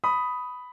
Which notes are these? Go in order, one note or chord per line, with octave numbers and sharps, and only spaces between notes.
B5 D#6